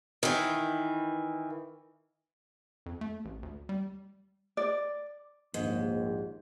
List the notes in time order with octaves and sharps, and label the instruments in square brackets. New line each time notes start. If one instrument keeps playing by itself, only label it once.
[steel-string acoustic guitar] D#3 E3
[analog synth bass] F2
A3
A1
D2
G3
[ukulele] D5
[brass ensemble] A#1 D#2 [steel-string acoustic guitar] G#2